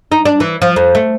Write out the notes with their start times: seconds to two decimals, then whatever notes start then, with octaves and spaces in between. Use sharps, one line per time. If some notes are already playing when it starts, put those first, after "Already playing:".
0.12 D#4
0.25 D4
0.40 E3
0.62 F3
0.76 F2
0.95 A3